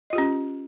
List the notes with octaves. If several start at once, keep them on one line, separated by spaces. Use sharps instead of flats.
C#4 F4 G4 D#5